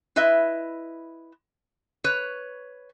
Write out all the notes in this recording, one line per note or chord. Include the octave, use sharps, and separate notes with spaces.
E4 B4 D#5 E5
B4 C#5